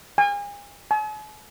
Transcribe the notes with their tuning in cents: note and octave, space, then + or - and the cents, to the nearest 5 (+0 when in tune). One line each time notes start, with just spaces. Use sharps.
G#5 -35
G#5 +45